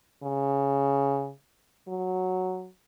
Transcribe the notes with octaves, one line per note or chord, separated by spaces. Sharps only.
C#3
F#3